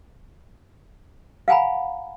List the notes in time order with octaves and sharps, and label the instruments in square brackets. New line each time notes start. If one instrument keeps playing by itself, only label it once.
[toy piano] F5 F#5 G#5 A#5 B5